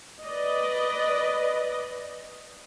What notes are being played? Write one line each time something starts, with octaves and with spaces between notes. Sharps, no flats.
B4 D5 D#5